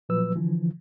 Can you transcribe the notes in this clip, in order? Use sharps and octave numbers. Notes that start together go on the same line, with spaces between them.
A#2 F3 F#3 B4 E6
D3 E3 F3